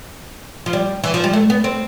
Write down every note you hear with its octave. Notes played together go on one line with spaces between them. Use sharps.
F3
G3
E3
F3
G3
A3
B3
C4